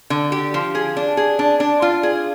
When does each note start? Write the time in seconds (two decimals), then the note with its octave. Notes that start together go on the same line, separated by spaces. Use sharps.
0.10 D3
0.32 G4
0.54 F3
0.75 G#4
0.97 D4
1.17 G#4
1.39 D4
1.60 D4
1.82 F4
2.03 G#4